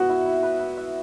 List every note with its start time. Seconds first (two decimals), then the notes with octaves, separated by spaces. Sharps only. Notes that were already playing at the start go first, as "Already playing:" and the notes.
Already playing: B3 F#4 E5
0.09 E4
0.26 E4
0.43 B4
0.59 E4
0.77 E5